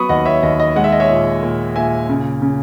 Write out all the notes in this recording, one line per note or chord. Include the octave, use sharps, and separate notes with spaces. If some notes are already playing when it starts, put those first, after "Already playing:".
Already playing: F#3 B3 B5 C#6 D#6
D#2 D#5 F#5
C#5 E5
D#2 D#5
D#5
G#3 F#5
E5
D#5
C#5 E5
A#2
A#2
A#2 E5 G#5
C#3
C#3